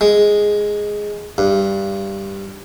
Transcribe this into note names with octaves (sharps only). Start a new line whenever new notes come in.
G#3
G2